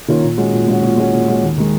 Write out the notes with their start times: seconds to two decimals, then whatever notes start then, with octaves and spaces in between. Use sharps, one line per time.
0.08 D#3 A#3 C#4 F4
0.24 A#2
0.37 G#3 C#4 F#4
0.53 A#2
0.68 G#3 C#4 F#4
0.83 A#2
0.97 G#3 C#4 F#4
1.13 A#2
1.28 G#3 C#4 F#4
1.43 D#2
1.57 D#3 G#3